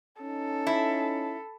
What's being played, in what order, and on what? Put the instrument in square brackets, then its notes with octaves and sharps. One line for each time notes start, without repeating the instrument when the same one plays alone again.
[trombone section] C#4 D#4 [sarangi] A4
[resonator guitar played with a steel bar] E4